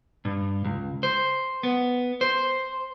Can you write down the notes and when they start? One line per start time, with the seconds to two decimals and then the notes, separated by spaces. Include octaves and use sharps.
0.25 G2
0.65 C#2
1.03 C5
1.63 B3
2.21 C5